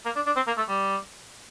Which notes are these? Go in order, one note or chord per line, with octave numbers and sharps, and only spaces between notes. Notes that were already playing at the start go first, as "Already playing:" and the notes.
A#3
D4
D4
C4
A#3
A3
G3